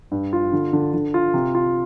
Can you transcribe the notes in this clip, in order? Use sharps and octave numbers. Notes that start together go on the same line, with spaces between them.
G2
F4
D3
D3
D3
F4
C3
F4